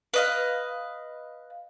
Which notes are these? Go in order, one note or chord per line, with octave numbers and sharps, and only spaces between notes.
B4 D#5 F5